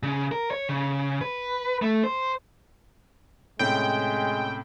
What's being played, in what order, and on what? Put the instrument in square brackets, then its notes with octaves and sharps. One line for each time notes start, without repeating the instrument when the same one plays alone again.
[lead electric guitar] C#3
A#4
C#5
C#3
B4
A3
C5
[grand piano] A2 C3 C#4 [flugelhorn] G#3 [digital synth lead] G5